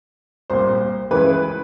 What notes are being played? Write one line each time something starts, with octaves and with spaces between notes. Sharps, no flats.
C2 A#2 C5
C#2 C#3 E3 B4